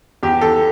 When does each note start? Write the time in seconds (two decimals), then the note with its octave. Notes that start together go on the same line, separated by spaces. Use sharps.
0.23 E2 G4
0.41 E2 A4